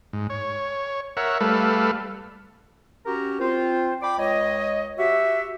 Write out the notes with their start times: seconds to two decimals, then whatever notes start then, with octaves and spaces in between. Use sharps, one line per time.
0.13 G#2
0.30 C#5
1.17 A#4 C#5 E5 F#5
1.40 G3 A3 A4 B4 F5
3.05 C#4 F#4 G4 A#4 A#5
3.40 C4 F4 C5
4.02 D5 G5 B5 D6
4.19 C#2 C#5 D#5
4.99 F#4 G4 E5